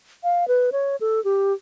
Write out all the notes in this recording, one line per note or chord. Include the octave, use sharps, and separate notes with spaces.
F5
B4
C#5
A4
G4